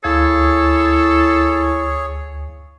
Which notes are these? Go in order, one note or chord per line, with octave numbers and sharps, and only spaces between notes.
D2 E4 G#4 A4 C#5 F5 G#6